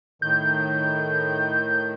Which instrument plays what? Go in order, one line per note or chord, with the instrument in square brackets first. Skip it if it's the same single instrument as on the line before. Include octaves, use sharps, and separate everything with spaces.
[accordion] A2 D#3 [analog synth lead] G6